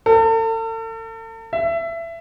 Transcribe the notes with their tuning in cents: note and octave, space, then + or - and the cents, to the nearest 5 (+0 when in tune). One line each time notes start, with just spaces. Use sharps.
A4 +40
E5 +20